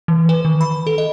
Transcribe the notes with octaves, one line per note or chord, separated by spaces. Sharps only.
E3
B4
D#3
B5
A4
D#5